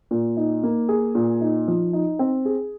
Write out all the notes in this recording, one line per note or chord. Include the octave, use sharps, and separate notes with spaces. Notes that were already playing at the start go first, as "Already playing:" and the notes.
A#2
D#4
A#3
G#4
A#2
D#4
F3
D#4
C4
G#4